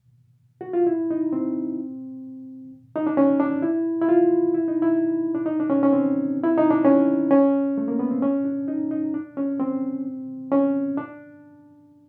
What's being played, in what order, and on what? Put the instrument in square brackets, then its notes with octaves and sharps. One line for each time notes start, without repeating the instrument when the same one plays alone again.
[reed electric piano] F#4
F4
E4
D#4
C4
D#4
D4
C#4
D4
E4
E4
F4
E4
D#4
E4
D4
D#4
D4
C#4
C#4
C4
E4
D#4
D4
C#4
C#4
A3
A#3
B3
C4
C#4
D4
D#4
D#4
D4
C#4
C4
C#4
D4